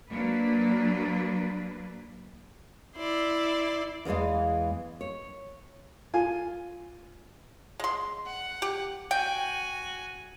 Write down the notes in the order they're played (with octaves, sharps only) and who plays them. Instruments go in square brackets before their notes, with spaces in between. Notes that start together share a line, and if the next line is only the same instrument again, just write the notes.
[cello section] F#3 A#3 D4 B4
[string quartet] E4 D5 C6
[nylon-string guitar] E2 D#3 E3 G#3 F5
C#5
[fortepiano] F4 G#5
[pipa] G#3 C6
[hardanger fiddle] F#5
[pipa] G4
[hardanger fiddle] F#4 G#5 [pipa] G5